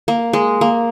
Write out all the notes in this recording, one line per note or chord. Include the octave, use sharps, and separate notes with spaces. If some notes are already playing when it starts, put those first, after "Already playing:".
A#3
G#3
A#3